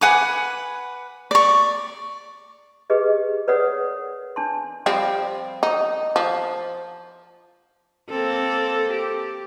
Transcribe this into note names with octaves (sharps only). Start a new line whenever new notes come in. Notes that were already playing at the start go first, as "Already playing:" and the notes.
B4 F#5 G#5 D6
D5 C#6
G4 G#4 B4 D#5
A#4 B4 C#5 D5 F#5 D#6
D4 A5 C6
F3 G3 C4
D#4
F3
A#3 C4 A4
G4